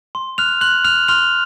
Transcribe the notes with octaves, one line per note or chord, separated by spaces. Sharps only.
C6
F6 F#6 F7
C6 F#6 F#7
F6 F#6 F7
C6 F6 F7